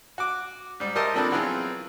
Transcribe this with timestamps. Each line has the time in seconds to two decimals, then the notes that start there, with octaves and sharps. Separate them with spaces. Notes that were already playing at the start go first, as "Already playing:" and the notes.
0.18 F#4 D6
0.80 G#2 G3
0.95 G4 A#4 C5 D#5 E5 A5
1.14 F3 A#3 C4 D4 A4 B4
1.31 E3 F#3 B3 C4 F4 G#4